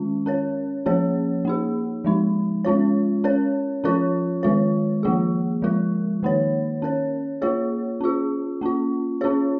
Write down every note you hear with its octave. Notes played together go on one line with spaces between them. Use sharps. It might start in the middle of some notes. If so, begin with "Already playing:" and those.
Already playing: D#3 G#3 C#4 F4
C#4 A#4 C#5
F3 A#3 C#4 G#4 C#5
A#3 D#4 G#4
F3 G#3 D#4
G#3 C#4 F4 C#5
C#4 A#4 C#5
F3 C#4 F4 A#4 C#5
D#3 G#3 F4 C#5
F3 A#3 F4 G#4
F3 G#3 F4 A#4
D#3 A#3 D#4 C#5
C#4 A#4 C#5
A#3 F4 G#4 C#5
C#4 F4 G#4
A#3 C#4 F4
C#4 F4 G#4 C#5